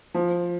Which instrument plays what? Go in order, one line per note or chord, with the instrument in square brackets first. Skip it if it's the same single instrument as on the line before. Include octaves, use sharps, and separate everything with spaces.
[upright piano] F3